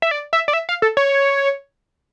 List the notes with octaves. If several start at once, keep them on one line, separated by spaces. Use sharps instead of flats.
E5
D5
E5
D5
E5
F5
A4
C#5